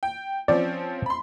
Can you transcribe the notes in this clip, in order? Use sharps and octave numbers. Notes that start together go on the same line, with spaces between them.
G5
F3 C4 C#4 D5
B5 C6